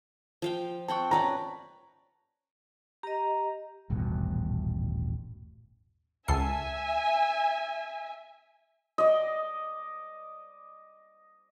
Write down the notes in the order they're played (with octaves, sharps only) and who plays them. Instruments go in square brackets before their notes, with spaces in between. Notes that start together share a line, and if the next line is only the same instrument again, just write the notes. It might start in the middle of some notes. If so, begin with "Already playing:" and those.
[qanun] F3 F5 G5
[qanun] C4 F#5 G5 [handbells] A5 C#6
[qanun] C#4 B4 D5 [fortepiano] A#5
[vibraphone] G4 D#5 [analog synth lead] A#5
[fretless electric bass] D#1 A1 G2 B2
[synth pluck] C#2 A4 C7 [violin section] E5 G#5
[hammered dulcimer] D5 D#5